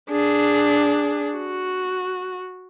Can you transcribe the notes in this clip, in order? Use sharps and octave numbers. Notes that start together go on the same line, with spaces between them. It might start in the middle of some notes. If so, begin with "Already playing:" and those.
D4 G#4
F#4